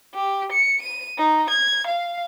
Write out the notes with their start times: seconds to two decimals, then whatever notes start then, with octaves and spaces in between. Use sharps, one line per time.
0.15 G4
0.53 C#7
0.82 D#7
1.18 D#4
1.50 G#6
1.87 F5